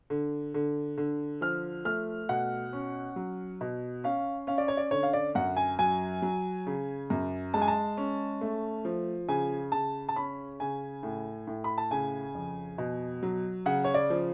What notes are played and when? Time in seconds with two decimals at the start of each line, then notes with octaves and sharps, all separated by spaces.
0.10 D3
0.54 D3
0.98 D3
1.41 F3 F6
1.85 A3 F6
2.29 B2 F#5
2.73 C#4
3.16 F#3
3.61 B2
4.04 C#4 F5
4.47 C#4 F5
4.58 D5
4.68 C#5
4.77 D5
4.91 D3 C#5
5.03 F5
5.13 D5
5.35 F#2 F#5
5.56 G#5
5.79 F#3 G#5
6.22 F#3
6.67 C#3
7.10 F#2
7.54 G#3 A5
7.62 G#5
7.68 A5
7.97 C#4
8.41 A3
8.85 F3
9.29 C#3 G#5
9.72 C#3 A5
10.09 A5
10.16 C#4 B5
10.60 C#3 G#5
11.03 A2
11.47 A2
11.64 B5
11.78 A5
11.91 C#3 G#5
12.35 F2
12.78 B2
13.23 F#3
13.66 C#3 F#5
13.84 C#5
13.94 D5
14.10 F3